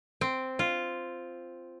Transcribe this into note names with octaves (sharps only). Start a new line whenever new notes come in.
C4
F4